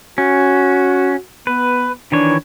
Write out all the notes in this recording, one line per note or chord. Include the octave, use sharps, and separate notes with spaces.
C#4 F#4
B3 B4
D#3 E3 D4 C#5